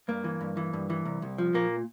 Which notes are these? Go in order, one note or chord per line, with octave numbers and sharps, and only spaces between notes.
G2 A#3
E3
G2
E3
G2
E3
C2
C2
F3
A#2 A#3